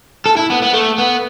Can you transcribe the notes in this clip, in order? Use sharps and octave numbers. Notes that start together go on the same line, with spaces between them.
A4
E4
B3
B3
A3
B3